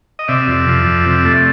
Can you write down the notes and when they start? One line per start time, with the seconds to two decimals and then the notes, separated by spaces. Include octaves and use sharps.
0.19 D#5
0.28 C3 D5 E5
0.48 F2
0.68 F3
0.86 F2
1.06 C3
1.25 A3